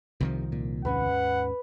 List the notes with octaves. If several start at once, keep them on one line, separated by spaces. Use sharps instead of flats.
C2 C3 D#3 F3
A#2
D#2 G#2 C#4 B4 F#5